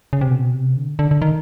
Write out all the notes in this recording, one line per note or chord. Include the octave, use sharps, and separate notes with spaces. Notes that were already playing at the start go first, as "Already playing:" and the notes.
C#3
C3
B2
C3
D3
D3
D3
D#3